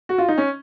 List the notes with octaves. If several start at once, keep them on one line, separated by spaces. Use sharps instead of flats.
F#4
F4
D#4
C#4